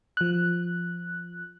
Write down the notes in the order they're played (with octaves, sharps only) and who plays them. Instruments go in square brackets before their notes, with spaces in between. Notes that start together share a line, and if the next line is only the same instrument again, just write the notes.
[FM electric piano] F3 F#6